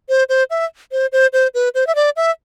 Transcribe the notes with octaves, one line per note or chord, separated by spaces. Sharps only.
C5
C5
E5
C5
C5
C5
B4
C5
E5
D5
E5